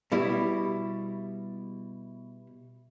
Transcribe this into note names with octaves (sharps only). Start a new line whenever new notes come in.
B2 G3 E4